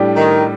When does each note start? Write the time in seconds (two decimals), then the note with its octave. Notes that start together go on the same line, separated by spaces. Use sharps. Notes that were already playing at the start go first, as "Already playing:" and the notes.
Already playing: A2 G3 D4 G4
0.16 D#3